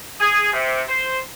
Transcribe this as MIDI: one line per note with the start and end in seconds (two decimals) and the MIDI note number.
0.20 0.48 68
0.53 0.81 48
0.89 1.18 72